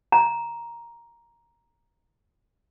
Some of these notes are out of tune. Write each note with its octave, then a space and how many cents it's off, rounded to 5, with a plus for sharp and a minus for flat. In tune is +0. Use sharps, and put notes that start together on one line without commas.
A#5 +5